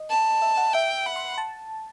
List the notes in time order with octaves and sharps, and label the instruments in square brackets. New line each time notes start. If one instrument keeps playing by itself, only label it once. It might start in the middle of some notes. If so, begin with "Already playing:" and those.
Already playing: [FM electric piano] D#5
[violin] A5
[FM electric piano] E5
F#5
[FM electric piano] E5 [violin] G5
[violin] F#5 [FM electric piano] B5
[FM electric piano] C6
A5